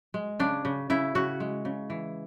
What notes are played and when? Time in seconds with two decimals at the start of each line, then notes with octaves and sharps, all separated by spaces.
0.14 G#3
0.40 C#3 D4
0.65 C#3
0.90 C#3 E4
1.15 C#3 F#4
1.40 G#3
1.65 C#3
1.90 E3